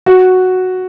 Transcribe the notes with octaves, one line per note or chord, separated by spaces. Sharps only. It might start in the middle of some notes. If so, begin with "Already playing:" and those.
F#4